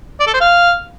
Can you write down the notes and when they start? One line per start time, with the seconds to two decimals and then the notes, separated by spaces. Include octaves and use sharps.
0.20 D5
0.27 A4
0.34 C5
0.41 F5